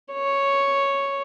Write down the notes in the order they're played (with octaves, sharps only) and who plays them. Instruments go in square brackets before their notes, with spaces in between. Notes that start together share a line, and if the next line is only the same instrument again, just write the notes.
[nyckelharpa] C#5